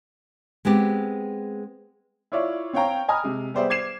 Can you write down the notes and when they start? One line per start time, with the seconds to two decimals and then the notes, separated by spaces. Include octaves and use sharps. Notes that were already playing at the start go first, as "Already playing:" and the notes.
0.65 G#3 B3 C4 G4
2.32 E4 F4 C#5 D5 E5
2.73 C4 C#5 F5 G5 A#5
3.08 D#5 G#5 A#5 B5 D#6 F6
3.24 C3 G#3
3.54 G3 B3 G#4 C5 D5 E5
3.70 D6 G#6 C7 E7